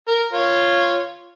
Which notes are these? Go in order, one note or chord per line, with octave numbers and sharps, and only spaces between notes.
A#4
F4 C#5